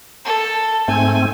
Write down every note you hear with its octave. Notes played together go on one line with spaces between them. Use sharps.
A4
G#2 A3 C4 G#5